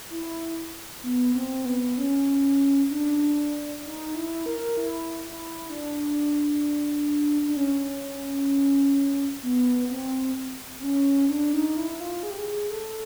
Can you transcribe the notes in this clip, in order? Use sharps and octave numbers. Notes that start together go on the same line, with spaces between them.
E4
B3
C4
B3
C#4
D4
D#4
E4
A#4
E4
E4
D4
D4
C#4
B3
C4
C4
C#4
D4
D#4
E4
F4
G#4
G4
G#4
A4